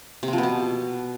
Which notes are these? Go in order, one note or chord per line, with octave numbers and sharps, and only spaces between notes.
C3
C4
F3
B3
B2